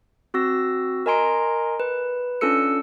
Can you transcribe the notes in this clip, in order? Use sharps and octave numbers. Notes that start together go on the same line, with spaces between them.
C4 F#4 E6 A#6
A#4 D#5 G#5 A#5 C6 D7
B4
C#4 D4 F4 A4 E6 C#7